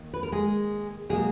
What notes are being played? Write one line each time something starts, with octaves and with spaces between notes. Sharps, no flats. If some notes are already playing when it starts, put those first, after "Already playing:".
Already playing: D#3 A#3
B4
A#4
G#3 G#4
B2 F#3 G#3 A#3 G#4